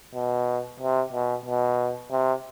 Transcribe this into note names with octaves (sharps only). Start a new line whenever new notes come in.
B2
C3
B2
B2
C3